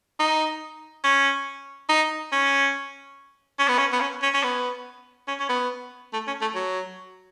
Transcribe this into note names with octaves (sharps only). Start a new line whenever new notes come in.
D#4
C#4
D#4
C#4
C#4
B3
C#4
B3
C#4
C#4
C#4
B3
C#4
C#4
B3
A3
C#4
A3
F#3